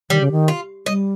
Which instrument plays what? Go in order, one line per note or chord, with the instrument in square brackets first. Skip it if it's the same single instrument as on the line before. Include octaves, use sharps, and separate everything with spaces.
[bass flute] D#3 [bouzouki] G3
[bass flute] C#3
D#3
[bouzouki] F4
[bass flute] G3 [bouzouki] D#5